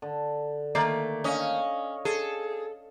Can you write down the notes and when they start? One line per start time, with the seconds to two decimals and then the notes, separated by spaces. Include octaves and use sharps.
0.02 D3
0.75 D#3 A3 A#3 D5
1.24 C#4 D#5 F5
2.05 G#4 A4